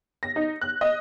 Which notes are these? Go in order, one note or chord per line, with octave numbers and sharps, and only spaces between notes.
A#6
D#4
F#6
D#5